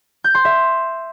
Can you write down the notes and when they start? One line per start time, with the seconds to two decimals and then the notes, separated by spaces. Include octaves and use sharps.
0.24 G6
0.35 C6
0.45 E5